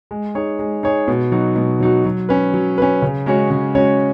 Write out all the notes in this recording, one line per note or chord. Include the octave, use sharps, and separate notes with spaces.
G#3
D#4 G#4 C#5
G#3
D#4 G#4 C#5
B2
F#3 D#4 F#4
B2
F#3 D#4 F#4
F#3
C#4 B4
F#3
C#4 B4
C#3
G#3 C#4 F#4 C#5
C#3
G#3 C#4 F#4 C#5